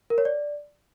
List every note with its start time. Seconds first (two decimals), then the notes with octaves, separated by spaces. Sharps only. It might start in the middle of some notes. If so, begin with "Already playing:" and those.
0.10 A#4
0.18 C#5
0.25 D5